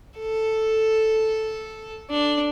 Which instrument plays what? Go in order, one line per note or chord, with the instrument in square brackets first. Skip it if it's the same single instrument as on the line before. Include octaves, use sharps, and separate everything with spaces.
[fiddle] A4
D4